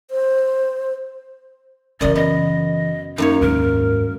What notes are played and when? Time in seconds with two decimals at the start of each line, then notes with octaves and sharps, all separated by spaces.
0.11 C5
2.01 F#2 C#3 E3 D5 D#5
2.15 B3 D#5
3.18 F#2 A#3 D#4 C#5
3.41 D#2 G#2 A#4